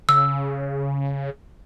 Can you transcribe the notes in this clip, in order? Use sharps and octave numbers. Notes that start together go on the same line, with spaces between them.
C#3 E6